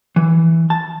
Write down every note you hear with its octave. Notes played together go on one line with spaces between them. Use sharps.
E3
A5